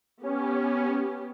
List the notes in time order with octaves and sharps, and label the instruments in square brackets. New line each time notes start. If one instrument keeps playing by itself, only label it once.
[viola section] B3 G4 [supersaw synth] C#4